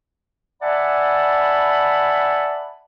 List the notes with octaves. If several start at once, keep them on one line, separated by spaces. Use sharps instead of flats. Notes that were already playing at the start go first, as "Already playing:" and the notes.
D5 E5 F#5 G#5 A5 B5